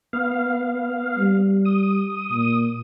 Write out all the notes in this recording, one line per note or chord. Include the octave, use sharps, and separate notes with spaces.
B3 F5
G3
D#6
A#2